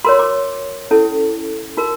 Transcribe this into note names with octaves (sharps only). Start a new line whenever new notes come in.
F#4 A#4 C#5 C6
D6
C#4 E4 A4
D#4 F#4 A#4